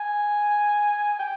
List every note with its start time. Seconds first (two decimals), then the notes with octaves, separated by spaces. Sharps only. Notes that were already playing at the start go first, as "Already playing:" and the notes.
Already playing: G#5
1.19 G5